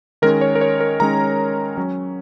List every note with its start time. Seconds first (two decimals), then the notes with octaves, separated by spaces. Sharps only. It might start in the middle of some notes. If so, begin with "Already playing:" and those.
0.22 D#3 G#3 C#4 A#4
0.41 C#5
0.55 A#4
0.61 C#5
0.80 A#4
1.00 D#3 G#3 C#4 A#5
1.77 F#3 C#4